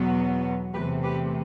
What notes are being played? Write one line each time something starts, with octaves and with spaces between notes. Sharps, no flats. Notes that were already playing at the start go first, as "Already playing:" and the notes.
Already playing: E2 B2 F#3 B3
E2 C3 E3 A3 G4 B4
G4 B4